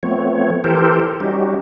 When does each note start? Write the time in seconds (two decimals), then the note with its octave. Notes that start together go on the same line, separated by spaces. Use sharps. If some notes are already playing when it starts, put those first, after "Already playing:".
0.03 F3 A3 B3 C4 C#5
0.64 E3 G4 A4 A#4 C5
1.20 G3 C#4 D#4 F#4 G4